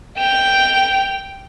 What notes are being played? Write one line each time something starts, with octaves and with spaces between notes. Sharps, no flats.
G5 F7